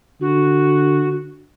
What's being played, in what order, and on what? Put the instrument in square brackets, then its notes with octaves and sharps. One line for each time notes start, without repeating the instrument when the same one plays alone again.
[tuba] D3 [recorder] F#4